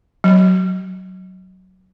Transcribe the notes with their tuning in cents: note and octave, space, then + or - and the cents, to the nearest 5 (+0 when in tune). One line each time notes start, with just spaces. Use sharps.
F#3 +10